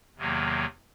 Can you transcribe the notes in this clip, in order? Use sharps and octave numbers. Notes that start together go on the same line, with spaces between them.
E2 C3 D#3 F#3 A#3